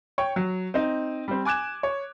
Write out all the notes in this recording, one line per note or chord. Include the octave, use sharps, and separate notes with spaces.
C#5 G5 C#6
F#3
C4 D#4
G3 C4
G#5 D6 F#6 G#6 E7
C#5